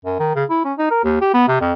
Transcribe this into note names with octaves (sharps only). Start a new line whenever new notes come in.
F#2
D#3
C#3
E4
C#4
D#4
A#4
D#2
G4
B3
C3
F2